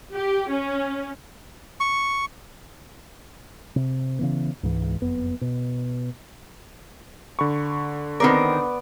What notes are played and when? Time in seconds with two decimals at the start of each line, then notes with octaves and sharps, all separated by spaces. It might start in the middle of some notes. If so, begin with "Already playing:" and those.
0.14 G4
0.51 C#4
1.80 C#6
3.76 C3
4.19 C#3 E3 B3
4.63 C#2 G#2 E3
5.00 F#1 F2 B3
5.41 B2
7.39 D3 B5 C#6
8.20 D#3 B3 C4 A#4 D5